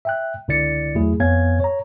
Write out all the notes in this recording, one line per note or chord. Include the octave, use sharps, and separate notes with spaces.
E5 G5 F#6
C#2 D3 E4 D5 A6 C#7
E2 F#3 A3 E4 G#4
F2 B3 C#5 F5 G#5 G#6
C#5 A#5